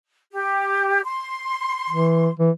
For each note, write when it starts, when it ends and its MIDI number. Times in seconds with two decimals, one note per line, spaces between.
0.32 1.01 67
1.05 2.31 84
1.90 2.29 52
2.39 2.50 52